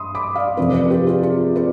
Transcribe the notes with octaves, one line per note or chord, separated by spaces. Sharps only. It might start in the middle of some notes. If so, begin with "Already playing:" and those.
Already playing: G2 B5 C6 D#6
B5 D6
D5 F5
F2 C3 F3 B4 D5
B4 D5
G4 B4
F4 G#4
F4 G#4
B4 D5